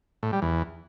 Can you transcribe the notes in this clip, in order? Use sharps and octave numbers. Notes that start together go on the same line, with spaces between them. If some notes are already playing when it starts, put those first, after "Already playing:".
A2
G3
E2